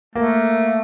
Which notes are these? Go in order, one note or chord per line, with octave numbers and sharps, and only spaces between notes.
A3 A#3